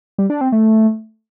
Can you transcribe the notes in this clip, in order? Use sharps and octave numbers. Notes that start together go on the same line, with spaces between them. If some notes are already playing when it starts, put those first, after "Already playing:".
G3
D4
C4
A3